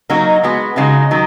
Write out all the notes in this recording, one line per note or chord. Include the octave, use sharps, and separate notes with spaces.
F#3 A#3 D#4 F#4
G#3 B3 F#4
C#3 G#3 D#4 F#4
D#3 F#3